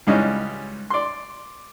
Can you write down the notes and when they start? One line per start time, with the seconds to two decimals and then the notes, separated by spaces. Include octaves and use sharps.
0.07 C#2 G#2 E3 G3 C#4 D#5
0.90 D5 C6